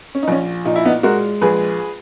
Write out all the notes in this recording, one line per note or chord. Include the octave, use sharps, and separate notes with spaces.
C#4
D#4
A#1 C#4
A#2 D#4
E4
B3 D#4
G#3 F#4 A#4
A#1 G#4 B4